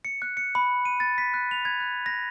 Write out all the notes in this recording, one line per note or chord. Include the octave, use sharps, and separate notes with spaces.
C#7
F#6
C#7
B5
D#7
A6
B6
F#6
F7
G#6
F#6
A#6